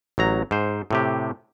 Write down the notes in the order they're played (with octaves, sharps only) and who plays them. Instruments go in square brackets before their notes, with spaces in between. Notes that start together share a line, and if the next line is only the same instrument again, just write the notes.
[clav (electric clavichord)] A1 F#3 A#5
G#2 C5
A2 C3 G4